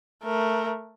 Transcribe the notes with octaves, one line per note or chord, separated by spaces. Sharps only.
A3 A#4